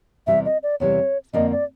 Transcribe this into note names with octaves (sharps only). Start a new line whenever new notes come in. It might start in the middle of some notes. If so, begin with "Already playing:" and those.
E2 C3 E3 G3 E5
D#5
D5
E2 C3 E3 G3 C#5
F2 D3 F3 A#3 D4 D#5
D5